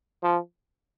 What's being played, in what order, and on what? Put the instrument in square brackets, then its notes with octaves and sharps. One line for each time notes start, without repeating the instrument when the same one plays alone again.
[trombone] F3